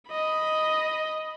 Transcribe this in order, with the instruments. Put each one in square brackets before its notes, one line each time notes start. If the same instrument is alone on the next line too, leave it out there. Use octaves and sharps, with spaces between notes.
[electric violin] D#5 B5